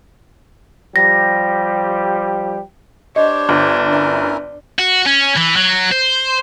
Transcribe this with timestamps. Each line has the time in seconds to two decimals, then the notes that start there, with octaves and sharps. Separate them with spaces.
0.96 F3 G3 G4 A#6
3.16 D4 G4 C5 C#5 D#5
3.49 G1
3.90 C#4 E4 A#4
4.79 F#4
5.06 C#4
5.36 E3
5.56 F#3
5.91 C5